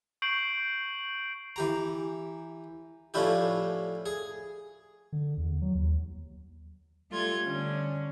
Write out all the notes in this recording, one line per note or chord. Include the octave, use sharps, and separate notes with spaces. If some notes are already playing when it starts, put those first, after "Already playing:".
C#6 G6 C7 D7 F#7
E3 G4 A#5
A2 F3 C#4 D4 E4 G4
G#4
D3
E2
F#3
D#2
G3 A3 F4 G#6
D3 C#4